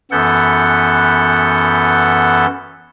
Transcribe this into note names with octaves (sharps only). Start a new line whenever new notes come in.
F#2 E3 B3 A4 F#5 G6